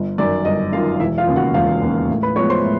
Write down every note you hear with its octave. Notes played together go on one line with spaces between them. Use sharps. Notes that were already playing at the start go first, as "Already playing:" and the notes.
Already playing: G1
F#2 D#3 D5
G1 D#5
F#2 D#3 F4 F5
E1 E4 E5
F4 F5
D#2 C#3
F#4 F#5
E1 F4 F5
D#2 C#3
A2
B4 B5
F3 G#3 B3 C#5 C#6
C5 C6
A2